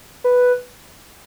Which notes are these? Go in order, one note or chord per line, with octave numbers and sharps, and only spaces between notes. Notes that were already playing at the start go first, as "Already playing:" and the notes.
B4